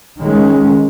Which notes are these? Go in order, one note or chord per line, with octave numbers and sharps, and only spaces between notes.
D#3 G#3 C#4